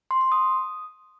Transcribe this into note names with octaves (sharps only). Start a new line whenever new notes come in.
C6
C6
D#6